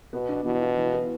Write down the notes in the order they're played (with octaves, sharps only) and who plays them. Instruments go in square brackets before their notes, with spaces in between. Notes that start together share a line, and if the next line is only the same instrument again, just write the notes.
[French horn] B2 [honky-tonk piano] B3
[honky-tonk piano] D4
[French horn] B2 [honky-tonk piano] E3
[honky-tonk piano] F4
E3
B3